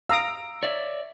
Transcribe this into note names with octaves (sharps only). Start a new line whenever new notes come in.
F5 A#5 D#6 E6 D7
C#5 D5 E5